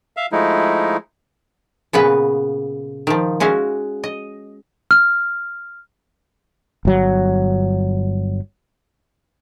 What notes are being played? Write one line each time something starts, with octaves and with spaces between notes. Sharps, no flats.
E5 F5
F3 G#3 A3 D#4 E4
A#2 C#3 B3 B4
D#3 F3
G#3 C#4 F#4 E5 F5
D#5
F6
G1 F#3